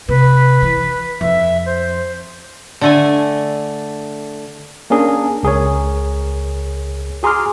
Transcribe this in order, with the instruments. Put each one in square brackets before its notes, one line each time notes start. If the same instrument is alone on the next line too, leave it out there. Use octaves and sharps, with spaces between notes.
[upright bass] C3 [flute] B4
[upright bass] E3
[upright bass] F2 [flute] E5
[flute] C5
[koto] D3 A3 G#5
[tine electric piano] A#3 C#4 D4 G#4 A#4
C#2 G#4 A#4 C#5
F#4 G#4 A#5 C6 D6 F6